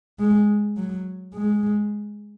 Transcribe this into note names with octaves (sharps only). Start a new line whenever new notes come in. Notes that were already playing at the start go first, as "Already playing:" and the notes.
G#3
F#3
G#3